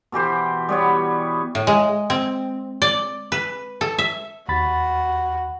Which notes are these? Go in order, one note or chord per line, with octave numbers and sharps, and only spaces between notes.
B2 E3 G4 C5
G3 B3 C#5
A2
G#3
C4
D5
B4
A4
E5
D#2 F#4 B5 A6